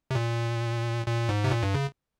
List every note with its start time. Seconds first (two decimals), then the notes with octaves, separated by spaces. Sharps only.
0.11 C3
0.15 A#2
1.06 A#2
1.29 G#2
1.44 C3
1.51 A#2
1.63 G2
1.74 C#3